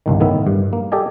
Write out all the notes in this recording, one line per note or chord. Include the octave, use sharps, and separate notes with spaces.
G1 C2 D#3
A2 D#3 B3 E5
G2
A#3
G4 A4 D5 D#5 G#5